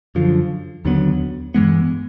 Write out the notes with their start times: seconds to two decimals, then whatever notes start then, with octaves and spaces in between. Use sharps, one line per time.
0.15 F#2 D3 F3
0.85 D#2 D3 F#3 B3
1.54 G2 E3 G#3 B3